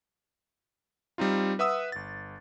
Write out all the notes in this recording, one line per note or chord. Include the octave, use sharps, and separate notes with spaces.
G3 C4 D#4 F4
B4 E5 F#5 D#6 E6
G1 A6